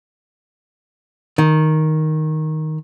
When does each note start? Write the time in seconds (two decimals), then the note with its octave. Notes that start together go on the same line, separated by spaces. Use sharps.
1.38 D#3